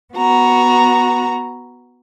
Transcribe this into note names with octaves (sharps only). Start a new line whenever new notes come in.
B3 F#4 A#5